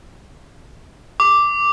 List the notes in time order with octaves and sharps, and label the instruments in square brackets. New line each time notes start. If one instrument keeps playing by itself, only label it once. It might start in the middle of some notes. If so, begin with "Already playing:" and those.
[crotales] D6